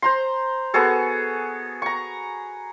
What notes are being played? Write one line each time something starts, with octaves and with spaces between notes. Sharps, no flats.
C5 A#5 C6
B3 F#4 G#4 A4
A#5 C#6